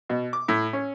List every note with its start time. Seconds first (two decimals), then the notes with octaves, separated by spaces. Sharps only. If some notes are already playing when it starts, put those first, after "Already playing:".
0.09 B2
0.33 D6
0.48 A2
0.73 C#4